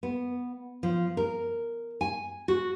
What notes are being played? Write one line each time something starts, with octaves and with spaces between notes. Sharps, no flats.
B3
F3
A#4
G#5
F#4